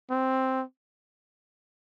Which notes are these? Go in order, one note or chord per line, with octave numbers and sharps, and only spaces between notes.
C4